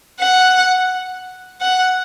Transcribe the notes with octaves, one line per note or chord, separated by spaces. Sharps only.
F#5
F#5